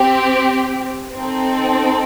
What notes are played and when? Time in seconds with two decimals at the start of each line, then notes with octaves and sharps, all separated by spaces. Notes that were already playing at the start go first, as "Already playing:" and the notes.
Already playing: C4 G4
1.15 C4 D#4 A4